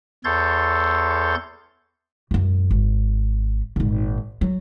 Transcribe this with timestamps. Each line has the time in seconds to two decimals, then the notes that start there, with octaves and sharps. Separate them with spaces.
0.24 E2 A4 C#5 C6 G6 A6
2.31 E1 F#2
2.71 G#1
3.76 G#1 A#2
4.41 F#3